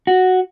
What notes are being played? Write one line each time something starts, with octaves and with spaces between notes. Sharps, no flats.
F#4